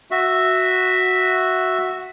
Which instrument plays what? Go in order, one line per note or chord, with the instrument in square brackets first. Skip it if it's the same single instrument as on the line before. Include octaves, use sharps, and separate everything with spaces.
[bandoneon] F#4 E5